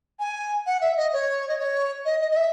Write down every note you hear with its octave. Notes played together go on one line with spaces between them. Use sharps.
G#5
F#5
E5
D#5
C#5
D#5
C#5
D#5
D#5
D#5
E5